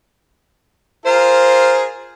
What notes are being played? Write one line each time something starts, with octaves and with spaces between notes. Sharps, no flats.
F4 G#4 A#4 C5